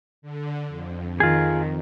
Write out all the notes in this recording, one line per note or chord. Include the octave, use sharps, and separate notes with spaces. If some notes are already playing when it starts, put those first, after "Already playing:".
D3
F2
D#3 F4 G#4